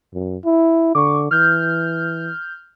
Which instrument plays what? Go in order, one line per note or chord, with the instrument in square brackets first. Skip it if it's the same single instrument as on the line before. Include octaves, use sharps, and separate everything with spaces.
[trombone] F#2
E4
[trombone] D3 [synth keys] C#6 D6
[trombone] E3 [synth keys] F6 G6